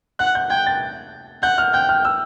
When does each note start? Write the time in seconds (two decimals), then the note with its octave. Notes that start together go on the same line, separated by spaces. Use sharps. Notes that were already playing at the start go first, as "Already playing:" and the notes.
0.19 F#5 F#6
0.35 G6
0.50 G5 G#6
0.66 A6
1.43 F#5 G6
1.58 F6
1.74 G5 G6
1.89 F6
2.05 E6